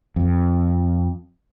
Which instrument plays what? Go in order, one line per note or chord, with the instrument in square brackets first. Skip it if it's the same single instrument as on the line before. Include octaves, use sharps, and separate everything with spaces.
[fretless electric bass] F2